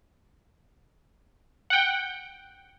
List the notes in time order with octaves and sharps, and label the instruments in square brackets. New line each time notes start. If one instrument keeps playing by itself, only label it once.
[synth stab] F#5 G5